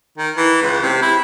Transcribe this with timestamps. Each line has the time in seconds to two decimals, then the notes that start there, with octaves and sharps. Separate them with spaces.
0.18 D#3
0.37 E3
0.62 C#2
0.82 C3
1.02 E4